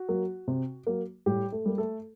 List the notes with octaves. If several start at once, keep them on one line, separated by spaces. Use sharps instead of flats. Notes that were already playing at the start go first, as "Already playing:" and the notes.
Already playing: F#4
F#3 A#3
C3
F#3 A#3
A2 G3 G4
A3 A4
G3 A#3
A3 A4